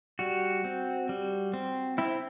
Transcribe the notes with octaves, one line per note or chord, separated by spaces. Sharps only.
G3 F#4
C4
G3
C4
C4 E4